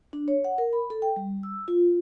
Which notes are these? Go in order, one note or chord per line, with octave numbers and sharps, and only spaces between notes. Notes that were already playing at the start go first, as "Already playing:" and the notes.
D4
C#5
F#5
A#4
B5
A4
G5
G3
E6
F4